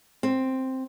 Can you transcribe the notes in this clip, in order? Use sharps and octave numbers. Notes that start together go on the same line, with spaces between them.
C4